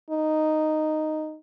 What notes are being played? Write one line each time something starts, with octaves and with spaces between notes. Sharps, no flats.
D#4